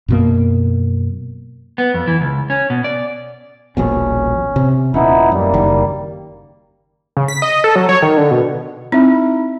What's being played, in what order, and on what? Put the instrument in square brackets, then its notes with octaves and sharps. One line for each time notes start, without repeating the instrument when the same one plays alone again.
[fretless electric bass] F#2 B2 A#3
[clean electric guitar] B3
F2
E3
C#2
C#4
B2
D5
[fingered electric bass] D#1 A#1 B2 [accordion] C#4
[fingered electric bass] C3
[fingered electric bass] D#1 C#4 [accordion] B3 D#4 E4
[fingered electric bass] F#2 [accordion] G3 A#3
[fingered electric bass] F#1 D#3
[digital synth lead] C#3
B6
D#5
A4
F#3
C#5
D#3
D3
B2
[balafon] C4 [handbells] D#4 E4 E5